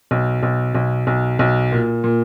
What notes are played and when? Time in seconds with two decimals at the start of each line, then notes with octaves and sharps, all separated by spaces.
0.11 B1
0.43 B1
0.75 B1
1.07 B1
1.39 B1
1.72 A#2
2.04 A#2